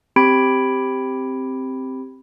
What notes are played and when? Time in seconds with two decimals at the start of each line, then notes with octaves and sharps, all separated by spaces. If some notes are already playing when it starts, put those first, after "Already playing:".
0.16 C4 G4 B5 G#6 D7